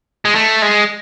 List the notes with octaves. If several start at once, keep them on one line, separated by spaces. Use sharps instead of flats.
G#3
A3
G#3